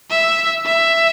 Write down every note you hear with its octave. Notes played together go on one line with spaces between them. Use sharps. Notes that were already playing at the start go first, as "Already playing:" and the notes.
E5
E5